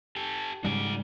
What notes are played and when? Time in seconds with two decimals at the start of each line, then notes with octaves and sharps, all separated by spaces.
0.16 G4 A4
0.64 G#2 C#3 G3 F#4 D5